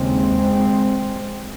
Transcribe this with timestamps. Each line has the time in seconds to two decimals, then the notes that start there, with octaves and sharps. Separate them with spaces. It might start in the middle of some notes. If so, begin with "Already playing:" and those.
Already playing: D#2 C#3 G#3 C4